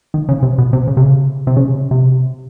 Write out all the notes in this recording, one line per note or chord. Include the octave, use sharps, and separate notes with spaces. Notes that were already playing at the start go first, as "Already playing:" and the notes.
D#3
C#3
C3
B2
C3
C#3
C3
C#3
C3
C#3
C3
C3